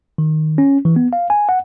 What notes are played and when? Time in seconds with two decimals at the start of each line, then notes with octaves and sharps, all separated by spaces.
0.18 D#3
0.58 C#4
0.85 E3
0.96 B3
1.13 F5
1.30 G#5
1.49 F#5